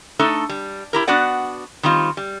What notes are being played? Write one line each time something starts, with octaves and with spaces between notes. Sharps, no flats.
A3 D4 D#4 A4
G3
E4 G4 A#4
B3 D4 F#4 D5 F#5
D#3 G3 C4 F4
G3